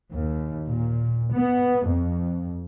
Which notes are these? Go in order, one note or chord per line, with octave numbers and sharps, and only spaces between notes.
D#2
A#2
B3
F2